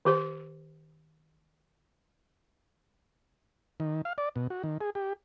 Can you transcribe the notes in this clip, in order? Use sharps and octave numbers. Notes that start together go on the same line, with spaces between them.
D#3 G4 C5
D#3
F5
D5
B2
F#4
D#3
G#4
G4